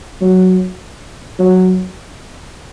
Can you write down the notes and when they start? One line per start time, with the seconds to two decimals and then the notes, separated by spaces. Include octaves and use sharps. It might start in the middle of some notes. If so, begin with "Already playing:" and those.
0.21 F#3
1.39 F#3